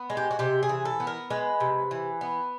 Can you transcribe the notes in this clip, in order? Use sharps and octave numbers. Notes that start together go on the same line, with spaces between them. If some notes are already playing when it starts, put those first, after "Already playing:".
Already playing: B3
G#3
G4
F#4
C3 G4
G#4
E3
A4
B3
A#4
G#3 B4
C3
E3
B3